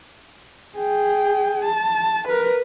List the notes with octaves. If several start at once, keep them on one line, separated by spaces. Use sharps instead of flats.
G#4 G5
A5
A#4 B4